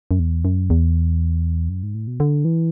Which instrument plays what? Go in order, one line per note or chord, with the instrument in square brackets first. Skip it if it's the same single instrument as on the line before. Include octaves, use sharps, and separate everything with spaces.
[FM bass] F#2
E2
F#2
E2
F#2
G#2
A2
B2
D3
E3